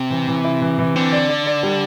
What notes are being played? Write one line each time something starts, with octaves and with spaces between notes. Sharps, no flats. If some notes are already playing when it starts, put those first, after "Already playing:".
Already playing: C3
E3
E3
E4
E3
E3
D3 C4
D5
D5
D5
G3